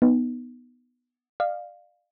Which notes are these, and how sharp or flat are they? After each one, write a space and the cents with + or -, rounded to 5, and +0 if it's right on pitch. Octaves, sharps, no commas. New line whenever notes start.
B3 +0 D#4 -10
D5 +40 F5 +0